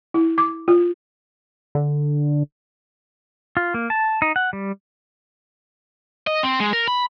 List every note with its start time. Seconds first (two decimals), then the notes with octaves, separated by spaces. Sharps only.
0.14 E4
0.38 D6
0.68 F4
1.75 D3
3.57 F4
3.74 A#3
3.90 A5
4.22 D#4
4.36 F#5
4.53 G3
6.27 D#5
6.43 C4
6.60 G#3
6.73 A#4
6.88 B5